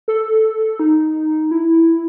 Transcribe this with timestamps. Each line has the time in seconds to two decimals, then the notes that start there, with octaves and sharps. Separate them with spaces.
0.08 A4
0.79 D#4
1.51 E4